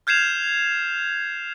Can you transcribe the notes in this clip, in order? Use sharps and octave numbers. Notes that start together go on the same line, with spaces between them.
F6 G6 G#6 C7 E7 F7